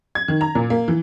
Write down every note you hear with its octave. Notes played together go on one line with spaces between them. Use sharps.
G#6
D#3
A#5
A#2
A#3
E3